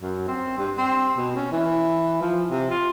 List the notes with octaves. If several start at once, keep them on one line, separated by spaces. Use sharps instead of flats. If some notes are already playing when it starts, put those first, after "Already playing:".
F#2
C4
G2
C4
B2
C#4
E3
F3
C3
F4